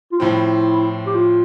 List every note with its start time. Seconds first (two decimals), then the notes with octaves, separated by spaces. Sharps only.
0.12 F4
0.19 A2 F3 C4 E4
1.06 G4
1.14 F4